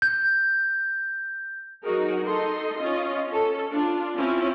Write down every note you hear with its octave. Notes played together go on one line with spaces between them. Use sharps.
G6
F#3 D#4 F#4 G#4 A#4
D#4 A4 D#5 C6
C#4 F4 D#5
C#4 A4
D4 F4
C4 C#4 E4 F4